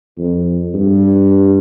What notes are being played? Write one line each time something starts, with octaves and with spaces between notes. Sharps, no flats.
F2
G2